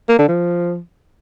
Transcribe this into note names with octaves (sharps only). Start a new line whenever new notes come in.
A#3
D3
F3